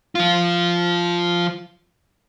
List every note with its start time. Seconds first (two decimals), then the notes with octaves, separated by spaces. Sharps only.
0.15 F3 F4